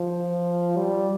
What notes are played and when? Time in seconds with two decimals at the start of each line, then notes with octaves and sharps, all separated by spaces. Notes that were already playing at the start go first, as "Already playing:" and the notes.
Already playing: F3
0.77 G3